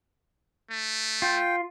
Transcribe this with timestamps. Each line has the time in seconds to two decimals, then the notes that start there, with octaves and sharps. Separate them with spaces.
0.71 A3
1.22 F4 G5